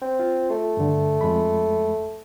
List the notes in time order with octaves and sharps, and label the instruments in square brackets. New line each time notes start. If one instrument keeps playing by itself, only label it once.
[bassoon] C4
[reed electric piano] F4
[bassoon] A3
[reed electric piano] G2 D3
F2 G#3 B5